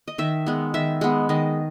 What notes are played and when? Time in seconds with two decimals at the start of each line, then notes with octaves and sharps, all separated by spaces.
0.08 D#5
0.18 D#3 E5
0.46 G#3 B3
0.74 D#3 E5
1.01 G#3 B3
1.29 D#3 D#5